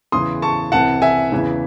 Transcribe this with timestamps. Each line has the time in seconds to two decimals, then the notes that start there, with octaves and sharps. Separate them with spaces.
0.12 E2 C#3 E3 C6 D#6
0.42 A5 C#6
0.72 C2 C3 E3 F#5 A5
1.02 E5 G#5
1.32 E2 C#3 E3